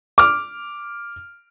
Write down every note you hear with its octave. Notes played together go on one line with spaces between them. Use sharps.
D6 F6